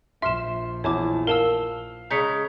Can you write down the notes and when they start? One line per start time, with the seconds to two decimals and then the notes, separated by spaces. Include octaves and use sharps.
0.22 A#1 F3 E5 C6 F6 E7
0.84 E2 C#5 A5 D6
1.27 A#4 F5 A5 E6
2.11 C#3 G#3 A#5 G6 B6 C#7